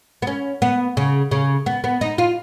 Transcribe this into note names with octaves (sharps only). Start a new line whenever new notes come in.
B3
C#4
B3
C#3
C#3
B3
B3
D#4
F4